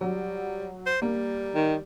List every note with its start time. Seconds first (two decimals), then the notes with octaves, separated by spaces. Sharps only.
0.01 F#3 G3
0.87 C5
1.02 G3 A#3
1.55 D#3